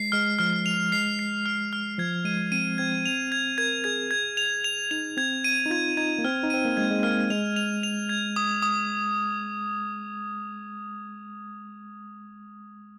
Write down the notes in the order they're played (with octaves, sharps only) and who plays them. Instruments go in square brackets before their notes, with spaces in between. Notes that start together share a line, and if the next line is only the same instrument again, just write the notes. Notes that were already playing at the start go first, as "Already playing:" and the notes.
Already playing: [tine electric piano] G#3 [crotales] C7
[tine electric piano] G#3 [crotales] F6
[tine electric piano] F3 [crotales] F6
[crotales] F7
[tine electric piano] G#3 [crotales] C7
[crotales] C7
F6
F6
[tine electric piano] F3 [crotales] G#6
[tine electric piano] G#3 [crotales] D#7
[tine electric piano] C4 [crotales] D#7
[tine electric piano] C4 [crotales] G#6
[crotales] F7
G#6
[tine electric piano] A#4 [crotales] G#6
[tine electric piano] G#4 [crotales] G#6
[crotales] G#6
F7
F7
[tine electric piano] D#4 [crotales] F7
[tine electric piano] C4 [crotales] G#6
[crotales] D#7
[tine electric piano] D#4
[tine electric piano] F4 [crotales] G#6
[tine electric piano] D#4 [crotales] G#6
[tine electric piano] A#3
[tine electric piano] C4 [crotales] F6
[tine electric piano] D#4
[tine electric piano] C4 [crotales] D#7
[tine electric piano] A#3
[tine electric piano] G#3 [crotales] G#6
[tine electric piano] G#3
[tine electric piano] A#3 [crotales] F6
[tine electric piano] G#3 [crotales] F7
[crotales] F7
F7
G#6
D#6
D#6